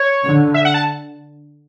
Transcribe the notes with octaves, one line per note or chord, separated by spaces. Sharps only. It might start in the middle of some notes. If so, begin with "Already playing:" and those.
Already playing: C#5
D3
E5
F#5
A5